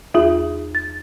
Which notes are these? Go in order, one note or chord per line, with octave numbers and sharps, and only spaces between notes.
E2 F4 G#4
A6